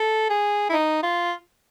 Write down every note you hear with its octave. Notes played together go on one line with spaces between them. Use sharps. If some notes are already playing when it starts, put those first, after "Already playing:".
Already playing: A4
G#4
E4
D#4
F4